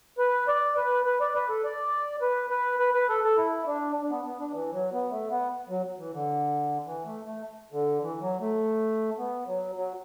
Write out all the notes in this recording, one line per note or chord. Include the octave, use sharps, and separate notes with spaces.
B4
D5
B4
B4
D5
B4
A4
D5
B4
B4
B4
B4
A4
A4
E4
D4
D4
B3
B3
D4
E3
F#3
B3
A3
B3
F#3
E3
D3
E3
A3
A3
D3
E3
F#3
A3
B3
F#3
F#3